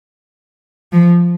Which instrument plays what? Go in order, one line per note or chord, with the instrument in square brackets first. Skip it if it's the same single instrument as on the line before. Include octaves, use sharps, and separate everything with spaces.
[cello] F3